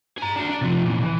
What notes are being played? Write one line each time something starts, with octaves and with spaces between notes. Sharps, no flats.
G#4 A#5
D4 F#4
D4
C3 F3
A#2 E3
E3